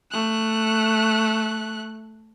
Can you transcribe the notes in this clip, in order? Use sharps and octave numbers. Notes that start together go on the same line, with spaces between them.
A3 F#6